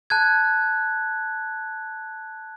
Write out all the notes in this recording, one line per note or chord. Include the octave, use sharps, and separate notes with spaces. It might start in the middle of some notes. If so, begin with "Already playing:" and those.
A5 F#6 G#6